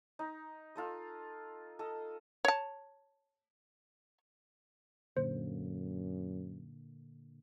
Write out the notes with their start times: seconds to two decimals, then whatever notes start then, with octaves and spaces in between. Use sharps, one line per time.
0.19 D#4
0.75 F4 A4 D#5
1.79 A4 D#5
2.45 C#5 A5
5.17 F#2 A#2 D3 A#3 C5